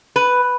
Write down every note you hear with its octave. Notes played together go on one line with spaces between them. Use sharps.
B4